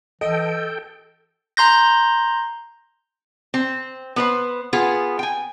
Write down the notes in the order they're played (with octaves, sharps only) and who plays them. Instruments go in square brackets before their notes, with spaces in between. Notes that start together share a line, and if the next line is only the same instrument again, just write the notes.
[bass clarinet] E3 [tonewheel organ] A4 G5 [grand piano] D#5
[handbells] A#5 C6 G6 A#6
[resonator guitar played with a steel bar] C4
B3 B4 C5
B3 F4 G#4
G5 G#5